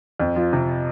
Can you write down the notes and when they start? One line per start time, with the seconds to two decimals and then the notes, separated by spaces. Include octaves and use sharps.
0.20 F2
0.36 F3
0.53 C3